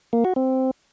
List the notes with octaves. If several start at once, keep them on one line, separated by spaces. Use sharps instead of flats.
A#3
F#4
C4